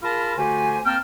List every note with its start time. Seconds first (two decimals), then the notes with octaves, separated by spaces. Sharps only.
0.03 F4 G#4 A#4 A5 B5 F6
0.37 D3 A3 F#4 G4 C5 G#5
0.85 A#3 C4 G5 A5 F6